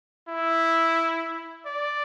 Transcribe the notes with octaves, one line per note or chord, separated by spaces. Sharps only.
E4
D5